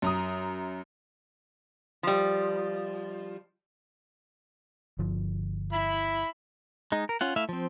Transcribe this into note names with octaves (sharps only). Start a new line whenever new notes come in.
F#2 A#5 D#6
F3 G3
G1 D3 F3
E4 B5
G#3 D#4
A#4
C#4 F4 F#5
A3 E4 E5 F5
F3 C4